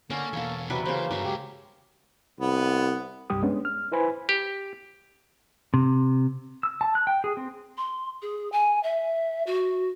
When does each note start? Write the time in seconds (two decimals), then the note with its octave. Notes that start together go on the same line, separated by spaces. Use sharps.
0.10 D3 A#3 C#4 A4
0.33 E2 B2 A#3 A4 C#5
0.70 C3 F#3 G3 B4
0.85 C#3 E3 A#3 C5
1.11 G2 D3 F#3 E5
1.24 C#3 G#3 G4
2.40 C2 B3
3.30 C2 G2 G3 G4 D#6
3.43 G#3 B3 C#4 D4
3.65 F6
3.92 E4 B4 C5 G#5 B5
4.29 G4
5.74 C3
6.63 E6
6.81 A5
6.95 F#6
7.07 G5
7.24 G#4
7.37 C4
7.77 C6
8.22 G#4
8.52 G#5
8.83 E5
9.47 F#4